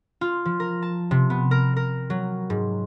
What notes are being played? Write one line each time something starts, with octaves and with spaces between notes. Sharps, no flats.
F4
F3
A#4
A5
C3
B3
A#4
A#4
F#3
G#2